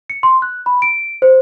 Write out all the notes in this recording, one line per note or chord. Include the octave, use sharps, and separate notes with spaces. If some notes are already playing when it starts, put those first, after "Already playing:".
C#7
C6
F#6
B5
D7
C5